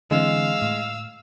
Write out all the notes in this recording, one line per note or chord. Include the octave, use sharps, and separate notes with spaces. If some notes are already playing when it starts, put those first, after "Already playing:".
D3 E3 G#3 C4 F5 E6
A2